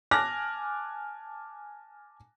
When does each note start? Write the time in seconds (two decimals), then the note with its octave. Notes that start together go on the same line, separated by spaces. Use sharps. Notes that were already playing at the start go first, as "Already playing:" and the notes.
0.11 G#5 A5 D6 F6 F#6 A#6